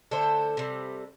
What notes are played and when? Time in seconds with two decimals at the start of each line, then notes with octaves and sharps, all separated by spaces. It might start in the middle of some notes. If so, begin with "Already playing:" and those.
0.11 D3 A3 A4 C5
0.57 C3 G3